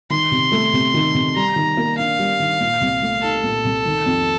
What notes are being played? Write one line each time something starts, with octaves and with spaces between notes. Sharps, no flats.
D#3 C6
C3
A3
C3
D#3
C3
G3 A#5
D#3
A#3
D4 F5
G3
D#3
A#2
C2
A3
D#4 A4
A#2
C2
D#3
F2